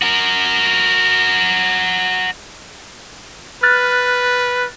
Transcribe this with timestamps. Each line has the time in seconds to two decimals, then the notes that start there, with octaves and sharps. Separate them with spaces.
0.02 F#4 A#4
3.63 B4 F6 F#6 A6